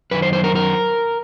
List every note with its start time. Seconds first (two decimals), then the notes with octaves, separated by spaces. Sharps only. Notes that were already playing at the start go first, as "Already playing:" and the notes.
0.11 F#2 B4
0.14 D#3
0.22 C5
0.33 C5
0.44 A#4
0.55 A#4